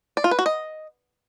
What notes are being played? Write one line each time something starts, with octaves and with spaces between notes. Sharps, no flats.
D5
F4
B4
F#4
D#5